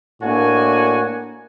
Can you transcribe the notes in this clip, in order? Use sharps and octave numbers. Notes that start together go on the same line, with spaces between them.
A2 A#3 D4 F#4 G#5